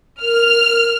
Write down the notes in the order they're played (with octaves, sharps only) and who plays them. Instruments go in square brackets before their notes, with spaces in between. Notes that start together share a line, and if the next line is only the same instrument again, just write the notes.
[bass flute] A#4 [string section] F6